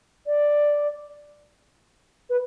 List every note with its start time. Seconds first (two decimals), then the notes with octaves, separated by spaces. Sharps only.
0.27 D5
2.30 B4